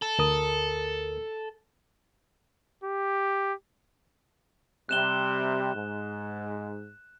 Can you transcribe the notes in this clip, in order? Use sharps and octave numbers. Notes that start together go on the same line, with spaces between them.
A4
D2 A#4 D#6
G4
C3 G3 F#6 E7 G7
G#2